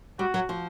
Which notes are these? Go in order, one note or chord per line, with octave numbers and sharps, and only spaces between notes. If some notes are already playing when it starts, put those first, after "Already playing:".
G3 F#4
F#3
F3